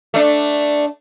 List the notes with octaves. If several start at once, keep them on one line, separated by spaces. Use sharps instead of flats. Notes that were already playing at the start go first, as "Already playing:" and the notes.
A3 D4